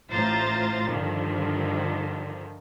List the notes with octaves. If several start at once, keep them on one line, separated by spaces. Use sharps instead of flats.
A1 A2 F4 C5 A#5 A6
G2 D3 D#3 F3